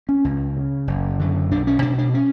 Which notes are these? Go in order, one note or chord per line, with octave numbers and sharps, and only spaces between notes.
C#4
C#2
C#3
F#1
F#2 D3
B1 D4
C#4
B2 D4
D4
C#4